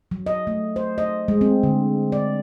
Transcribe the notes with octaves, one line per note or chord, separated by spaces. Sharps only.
F#3
D#5
A3
C5
D#5
G#3
C4
D3
D5